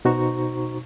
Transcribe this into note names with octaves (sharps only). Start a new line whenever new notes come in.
B2 D#4 F#4 C5 A#5 C#6